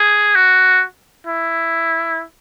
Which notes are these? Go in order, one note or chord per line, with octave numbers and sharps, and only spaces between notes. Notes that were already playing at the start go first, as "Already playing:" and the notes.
Already playing: G#4
F#4
E4